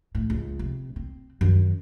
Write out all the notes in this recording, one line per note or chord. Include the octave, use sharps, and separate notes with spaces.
A2
C#2
C3
C4
F#2 D#3